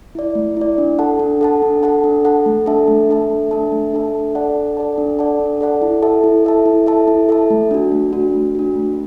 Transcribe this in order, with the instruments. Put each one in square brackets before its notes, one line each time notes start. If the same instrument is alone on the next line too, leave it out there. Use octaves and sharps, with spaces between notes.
[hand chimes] E4 D5
A3
E4 D5
D4
A4 F#5 A5
D4
A4 F#5 A5
D4
A4 F#5 A5
D4
A4 F#5 A5
A3
D4 A4 E5 A5
A3
D4 A4 E5 A5
A3
D4 A4 E5 A5
A3
D4 A4 E5 A5
D4
A4 D5 F#5 A5
D4
A4 D5 F#5 A5
D4
A4 D5 F#5 A5
D4
A4 D5 F#5 A5
E4
A4 E5 A5
E4
A4 E5 A5
E4
A4 E5 A5
E4
A4 E5 A5
A3
D4 F#4
A3
D4 F#4
A3
D4 F#4
A3